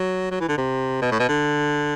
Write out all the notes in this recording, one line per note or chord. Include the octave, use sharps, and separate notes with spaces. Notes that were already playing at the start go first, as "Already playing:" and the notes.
Already playing: F#3
F#3
E3
D3
C3
B2
A2
B2
D3